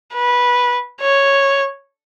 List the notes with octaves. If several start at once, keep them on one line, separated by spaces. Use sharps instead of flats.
B4
C#5